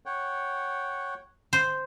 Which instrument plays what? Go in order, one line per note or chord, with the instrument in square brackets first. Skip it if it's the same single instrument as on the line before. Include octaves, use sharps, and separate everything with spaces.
[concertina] C#5 F#5 G5
[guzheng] C5